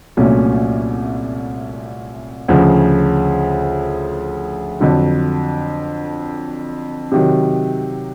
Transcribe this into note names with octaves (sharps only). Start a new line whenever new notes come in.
C2 A#2 F#3 A3 C#4
D2 C#3 F3
F2 D3 F#3
C3 D#3 F#3